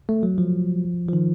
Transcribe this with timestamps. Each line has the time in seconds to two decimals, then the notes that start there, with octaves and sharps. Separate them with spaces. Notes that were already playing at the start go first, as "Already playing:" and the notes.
0.09 A3
0.23 F#3
0.38 F3
1.08 F3
1.13 D#3